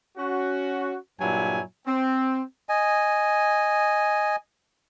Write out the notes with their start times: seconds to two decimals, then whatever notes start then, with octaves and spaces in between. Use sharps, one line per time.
0.17 C#4 F#4
1.19 G2 A#2 F#3 E4 G#5
1.87 C4
2.69 D#5 G#5